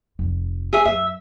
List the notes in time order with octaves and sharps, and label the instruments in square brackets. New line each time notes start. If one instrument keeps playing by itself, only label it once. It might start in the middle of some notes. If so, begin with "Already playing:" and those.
[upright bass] F1 F3
[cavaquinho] G#4 E5
[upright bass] F#2 [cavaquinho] E5